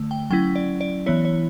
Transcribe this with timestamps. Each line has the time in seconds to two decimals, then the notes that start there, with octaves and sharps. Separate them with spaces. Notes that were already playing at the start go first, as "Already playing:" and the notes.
Already playing: D3 A3
0.11 G5
0.31 F#3 C#4 E4 G5
0.56 D5
0.81 D5
1.06 E3 B3 E4 C#5
1.25 C#5